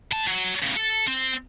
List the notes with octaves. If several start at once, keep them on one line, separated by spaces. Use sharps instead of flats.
A2 A5
F#3
A2 C#3
A4
C4